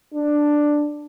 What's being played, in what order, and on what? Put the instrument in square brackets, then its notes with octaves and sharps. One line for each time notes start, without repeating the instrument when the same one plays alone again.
[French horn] D4